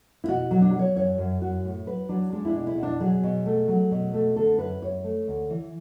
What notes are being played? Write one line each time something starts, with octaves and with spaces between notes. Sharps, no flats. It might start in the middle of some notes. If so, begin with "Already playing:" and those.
E4
B2 F#4
F#3
D4
F#3
C#5
F#2 C#5
F#2
F#2 F#4
A2
F#3 B4
F#3 D4
G#3 D4
E4
B2 D4
E4
B2
D4
F#3 G#4
B2
A3
F#3
B2
A3
D3 A4
F#2 B4
F#2 C#5
A3
D2
E3